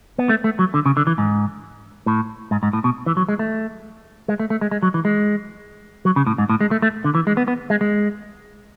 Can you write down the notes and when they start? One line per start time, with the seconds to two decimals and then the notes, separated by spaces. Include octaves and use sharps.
0.18 B3
0.29 A3
0.44 A3
0.59 F#3
0.74 D3
0.86 C#3
0.97 D3
1.07 E3
1.18 G#2
2.06 A2
2.51 G#2
2.63 G#2
2.73 A2
2.84 B2
3.06 E3
3.17 F#3
3.29 G#3
3.39 A3
4.28 G#3
4.40 A3
4.50 A3
4.61 G#3
4.71 G#3
4.83 F#3
4.94 E3
5.05 G#3
6.05 F#3
6.16 C#3
6.27 A2
6.38 G#2
6.49 A2
6.61 G#3
6.71 A3
6.82 A3
7.04 D3
7.15 E3
7.27 G#3
7.37 B3
7.48 B3
7.70 G#3
7.81 G#3